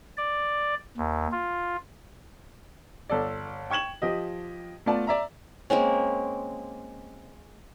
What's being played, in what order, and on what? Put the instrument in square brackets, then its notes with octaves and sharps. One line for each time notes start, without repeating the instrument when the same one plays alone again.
[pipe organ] D5
D#2
F4
[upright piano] G1 A4 D5
G5 C#6 G#6 E7 F#7
F3 G4 D#5
A3 B3 F4 D5 A5
D5 E5 A#5
[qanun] G#3 A#3 C4 C#4